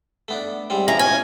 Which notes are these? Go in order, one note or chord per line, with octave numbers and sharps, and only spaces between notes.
A3 B3 D4
G#2 G3 C4
A1 E3 F3 A#5
C#4 G#5